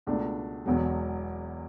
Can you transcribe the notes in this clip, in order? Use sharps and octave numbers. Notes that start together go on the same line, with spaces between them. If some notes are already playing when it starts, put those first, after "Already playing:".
C#2 B2 A3 D4
E1 E2 B2 F#3